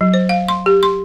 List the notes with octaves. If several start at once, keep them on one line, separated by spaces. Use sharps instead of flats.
F#3
C5
F5
C6
G4
C6